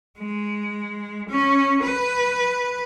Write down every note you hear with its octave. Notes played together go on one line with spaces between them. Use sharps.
G#3
C#4
B4